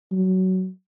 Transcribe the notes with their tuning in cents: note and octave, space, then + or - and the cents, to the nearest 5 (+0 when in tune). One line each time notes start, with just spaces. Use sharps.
F#3 +15